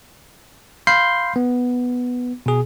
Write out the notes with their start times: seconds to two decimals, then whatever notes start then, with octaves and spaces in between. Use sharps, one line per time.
0.87 F5 B5 C6 G6 C7
1.36 B3
2.46 B2 G#4